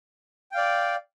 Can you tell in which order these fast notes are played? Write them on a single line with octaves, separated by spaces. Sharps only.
G5 F5 D5